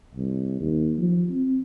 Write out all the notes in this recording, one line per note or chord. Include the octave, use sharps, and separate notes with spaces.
C2
D#2
F3
C4